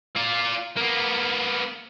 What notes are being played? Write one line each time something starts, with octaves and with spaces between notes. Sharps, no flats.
F4 D5
A#3 B3